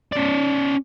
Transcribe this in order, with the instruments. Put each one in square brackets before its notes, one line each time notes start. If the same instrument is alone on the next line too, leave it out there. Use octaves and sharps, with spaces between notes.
[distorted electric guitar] C#4 D5